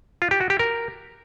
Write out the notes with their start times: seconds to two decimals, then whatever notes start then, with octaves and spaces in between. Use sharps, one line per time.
0.22 F4
0.31 G4
0.41 F#4
0.50 G4
0.59 A#4